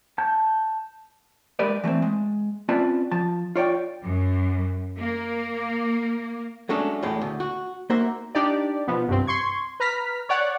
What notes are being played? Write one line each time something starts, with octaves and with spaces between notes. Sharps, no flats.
A5 G6
G3 G#3 G4 A#4 B4 D5
E3 A3 A#3 C4
G#3
C4 C#4 F4 B4 D5 A5
F3 A5
F4 C#5 D5 G5
F#2
A#3
F#3 G#3 A3 C#4 D4 G#4
E2 A2 G#3
D2
F#4
A#3 D#4 F#4 C5 E5
D4 D#4 G4 D5
B2 F3 B3
C2 G2 C4
C6 C#6 G#6
B4 A#5 F6 B6
C#5 D5 F#5